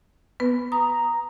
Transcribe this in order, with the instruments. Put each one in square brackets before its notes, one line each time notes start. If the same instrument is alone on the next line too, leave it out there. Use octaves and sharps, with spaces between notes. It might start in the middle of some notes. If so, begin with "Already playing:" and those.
[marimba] B3 B4
[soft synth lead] A#5 [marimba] D#6